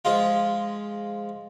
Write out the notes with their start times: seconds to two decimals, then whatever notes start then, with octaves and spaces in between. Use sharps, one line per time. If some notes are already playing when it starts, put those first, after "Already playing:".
0.05 F3 G#3 F4